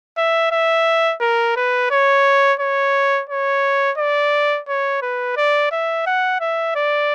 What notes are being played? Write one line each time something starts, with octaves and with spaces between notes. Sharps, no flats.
E5
E5
A#4
B4
C#5
C#5
C#5
D5
C#5
B4
D5
E5
F#5
E5
D5